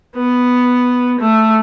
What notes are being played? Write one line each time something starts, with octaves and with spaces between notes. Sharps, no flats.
B3
A3